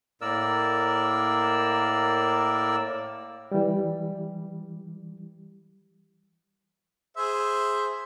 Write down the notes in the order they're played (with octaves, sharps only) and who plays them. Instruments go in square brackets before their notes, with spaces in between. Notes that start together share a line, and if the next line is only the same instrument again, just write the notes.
[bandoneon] A2 A#3 A#4 D5 E6
[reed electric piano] E3 G3
[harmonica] G#4 C5 E5